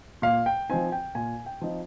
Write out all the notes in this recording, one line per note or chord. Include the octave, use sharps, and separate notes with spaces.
A#2 F5
G5
F3 C4 D#4 G#5
G5
A#2 G#5
G5
F3 C4 D#4